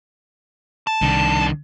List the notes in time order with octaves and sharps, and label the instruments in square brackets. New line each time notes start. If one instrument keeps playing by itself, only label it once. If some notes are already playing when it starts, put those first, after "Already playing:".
[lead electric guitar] A5
[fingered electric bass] C2 [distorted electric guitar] D#3 D4